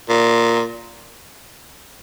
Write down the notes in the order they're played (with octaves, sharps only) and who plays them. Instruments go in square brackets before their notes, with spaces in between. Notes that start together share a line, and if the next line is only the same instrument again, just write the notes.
[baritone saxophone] A#2